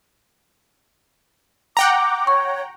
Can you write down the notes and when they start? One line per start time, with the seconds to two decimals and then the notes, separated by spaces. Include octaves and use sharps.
1.77 F#5 G5 A#5 D6
2.27 C#5 C#6